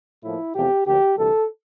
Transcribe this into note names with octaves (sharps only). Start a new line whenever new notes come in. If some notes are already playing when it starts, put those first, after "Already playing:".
A2 F3 A#3 E4
E2 C3 F3 A3 C4 G4
D2 D3 F3 A#3 G4
D2 C3 E3 G3 A4